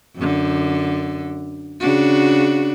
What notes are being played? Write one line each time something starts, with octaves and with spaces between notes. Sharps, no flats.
F#2 D3
C#3 D4 F#4